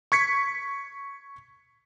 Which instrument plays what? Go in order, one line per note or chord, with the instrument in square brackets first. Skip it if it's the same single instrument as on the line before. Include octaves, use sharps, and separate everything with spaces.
[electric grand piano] C#6 G#6 B6 C#7